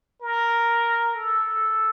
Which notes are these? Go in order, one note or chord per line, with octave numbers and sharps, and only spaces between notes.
A#4
A4